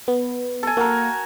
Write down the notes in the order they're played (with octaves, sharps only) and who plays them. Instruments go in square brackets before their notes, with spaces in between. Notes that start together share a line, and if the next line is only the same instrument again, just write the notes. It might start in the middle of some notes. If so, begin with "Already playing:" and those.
[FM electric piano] B3
[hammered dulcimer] A4 G#5
[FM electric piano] A#3 [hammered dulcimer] F#4 A#4